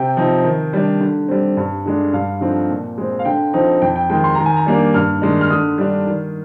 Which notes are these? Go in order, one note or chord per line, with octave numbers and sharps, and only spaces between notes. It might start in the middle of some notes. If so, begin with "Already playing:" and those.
Already playing: C3 G5
F3 C4 D#4
D#3
G3 D4
D3
G3 C4
G2
D3 G#3 D4
G2 F5
D3 F3 C4 D#4
A#2
G#3 C4
F5
D3 G5
F3 C4 D#4
F2 G5
G5
D#3 G#3 G5
C6
D#3 A#5
G#5
A#5
G3 A#3 D4
G2 F6
D#3 G#3 D4
F6
D3 D#6
G3 D4
D#3